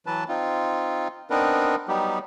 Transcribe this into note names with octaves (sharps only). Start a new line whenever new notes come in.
E3 F#3 B4 A5
C4 D#4 F4
B3 C4 D4 D#4 A#4 B4
F#3 G3 B3 D#4 G4